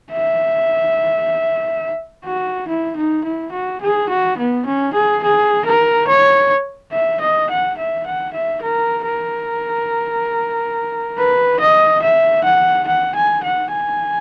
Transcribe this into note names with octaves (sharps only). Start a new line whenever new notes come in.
E5
F#4
E4
D#4
E4
F#4
G#4
F#4
B3
C#4
G#4
G#4
A#4
C#5
E5
D#5
F#5
E5
F#5
E5
A#4
A#4
B4
D#5
E5
F#5
F#5
G#5
F#5
G#5